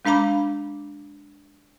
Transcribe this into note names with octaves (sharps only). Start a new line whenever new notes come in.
G#3 D4 F5 A#5 B5 D6